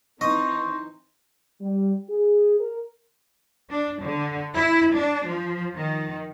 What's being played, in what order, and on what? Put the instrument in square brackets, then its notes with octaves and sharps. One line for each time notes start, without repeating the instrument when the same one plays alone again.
[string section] E3 C4 D#4 [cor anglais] C5 [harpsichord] D#5 [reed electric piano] C#6
[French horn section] G3
G#4
A#4
[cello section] D4
D3
E4
D4
F3
D#3